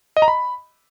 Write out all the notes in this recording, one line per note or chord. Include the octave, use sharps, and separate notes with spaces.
D#5
A#5
B5